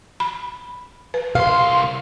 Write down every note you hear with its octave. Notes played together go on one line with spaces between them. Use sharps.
B5
B4
C2 F5 C6